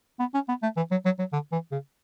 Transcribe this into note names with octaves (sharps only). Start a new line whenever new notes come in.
B3
C#4
B3
A3
E3
F#3
F#3
F#3
D3
E3
C#3